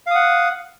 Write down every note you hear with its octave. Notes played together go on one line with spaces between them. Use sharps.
F5 F#5 D#6